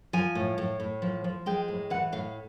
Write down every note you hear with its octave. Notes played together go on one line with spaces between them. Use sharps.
F3 G#5
A2
A2
A2
F3
F3
G#3 G5
A2
E3 F#5
A2 F5